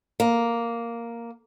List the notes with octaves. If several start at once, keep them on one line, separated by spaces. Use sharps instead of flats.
A#3